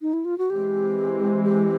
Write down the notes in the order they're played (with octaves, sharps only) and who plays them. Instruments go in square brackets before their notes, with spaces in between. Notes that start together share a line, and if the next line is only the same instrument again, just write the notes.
[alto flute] D#4
E4
F4
F#4
[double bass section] E3 G#3 C4 [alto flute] G4
[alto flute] G4